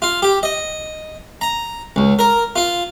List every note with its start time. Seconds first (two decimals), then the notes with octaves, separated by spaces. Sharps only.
0.02 F4
0.22 G4
0.43 D#5
1.41 A#5
1.96 C#2
2.19 A#4
2.56 F4